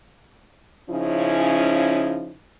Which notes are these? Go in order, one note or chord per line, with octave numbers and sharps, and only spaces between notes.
C#3 F3 C#4 D#4 E4